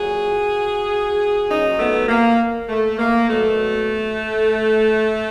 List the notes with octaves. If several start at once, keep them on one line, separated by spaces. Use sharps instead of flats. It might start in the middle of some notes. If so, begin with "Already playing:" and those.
Already playing: A#2 F#3 F#4 G#4
A#2 F#3 C#4 D#4
A3 B3
A#3
A3
A#3
B2 F#3 A3